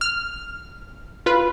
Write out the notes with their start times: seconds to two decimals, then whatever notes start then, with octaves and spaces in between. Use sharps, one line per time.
0.01 F6
1.26 F4 B4